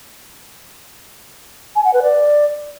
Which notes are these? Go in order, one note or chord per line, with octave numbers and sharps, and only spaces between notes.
G#5
F#5
B4
D5